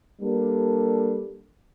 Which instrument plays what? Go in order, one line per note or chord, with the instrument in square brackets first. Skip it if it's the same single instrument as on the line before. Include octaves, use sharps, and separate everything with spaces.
[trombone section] G3 A#3 D4 A4